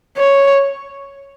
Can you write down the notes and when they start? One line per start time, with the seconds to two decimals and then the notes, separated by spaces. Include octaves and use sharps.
0.18 C#5